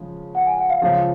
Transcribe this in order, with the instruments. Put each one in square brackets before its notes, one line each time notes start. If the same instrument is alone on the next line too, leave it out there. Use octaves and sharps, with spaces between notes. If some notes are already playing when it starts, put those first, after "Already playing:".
Already playing: [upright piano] C#3 F3 G#3
[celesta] F#5
G#5
F#5
F5
[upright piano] C#2 C#3 F3 [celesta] F5